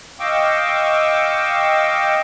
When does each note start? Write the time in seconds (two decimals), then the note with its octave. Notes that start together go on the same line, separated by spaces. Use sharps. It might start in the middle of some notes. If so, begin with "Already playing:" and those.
0.20 D#5 F5 G5 C#6 D6 E6